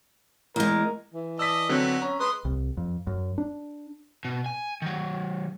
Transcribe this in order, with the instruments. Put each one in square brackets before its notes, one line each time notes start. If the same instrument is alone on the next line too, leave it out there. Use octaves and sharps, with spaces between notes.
[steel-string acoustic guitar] E2 G#3 [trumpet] A#4
[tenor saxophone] E3
[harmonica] D5 D#5 A5 [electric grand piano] E6 B6
[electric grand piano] D3 F#3 C4 [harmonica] B3 F#4
[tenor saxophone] C#4 [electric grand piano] A#5
[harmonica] G#3 C6 D#6 [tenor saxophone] B4
[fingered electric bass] C2
F2
F#2
D4
[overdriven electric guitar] B2
G#5
D#3 F#3